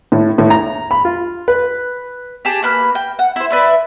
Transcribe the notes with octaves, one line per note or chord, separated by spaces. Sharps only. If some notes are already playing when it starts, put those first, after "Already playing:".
A2
A2
A#5
B5
F4
B4
G4 G#4 A5
A#3 B4 B5 F6
G5
F#5
E4 C5
B4 D5 E5 B5